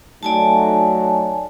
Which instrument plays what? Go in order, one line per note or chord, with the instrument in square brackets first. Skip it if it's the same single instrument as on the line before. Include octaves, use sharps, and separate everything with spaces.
[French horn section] F#3 A3 D#4 [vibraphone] D5 G#5 A5